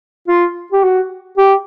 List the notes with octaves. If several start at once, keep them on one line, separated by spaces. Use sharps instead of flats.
F4
G4
F#4
G4